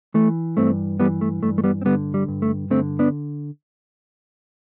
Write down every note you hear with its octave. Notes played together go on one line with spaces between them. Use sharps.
E3 A3
G2 A3 C4
E3 G3 B3
A3
G2 A3
A3
G3 B3
C4
D3 G3 B3
G3
G2
A3
D3 A3 C4
B3 D4